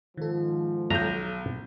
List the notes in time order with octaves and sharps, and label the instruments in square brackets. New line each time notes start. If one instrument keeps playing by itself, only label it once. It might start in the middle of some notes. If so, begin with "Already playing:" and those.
[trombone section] G#2 F3 [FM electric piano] D#3 A4
[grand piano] B1 G6 [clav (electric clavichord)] A#5